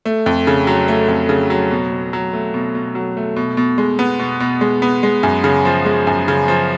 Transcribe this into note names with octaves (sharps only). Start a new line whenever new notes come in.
A3
F2
C#3
F#3
A3
F2
C#3
F#3
B2
B2
F#3
A3
B2
B2
F#3
A3
B2
B2
G#3
B3
B2
B2
G#3
B3
G#3
F#2
C#3
F3
G#3
F#2
C#3
F3